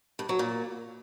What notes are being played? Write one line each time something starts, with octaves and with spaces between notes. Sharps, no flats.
G2
F#3
A#2